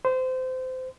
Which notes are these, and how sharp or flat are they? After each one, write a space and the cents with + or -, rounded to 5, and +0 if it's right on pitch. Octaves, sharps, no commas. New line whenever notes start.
C5 -25